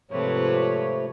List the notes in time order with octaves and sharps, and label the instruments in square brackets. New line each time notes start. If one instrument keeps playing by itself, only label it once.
[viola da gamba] G#2 C3 B4 [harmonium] F3 A3 C#5